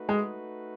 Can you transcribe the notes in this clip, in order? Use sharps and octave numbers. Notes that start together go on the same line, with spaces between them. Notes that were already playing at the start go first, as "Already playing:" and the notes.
Already playing: A3 D#4 F#4 B4
G#3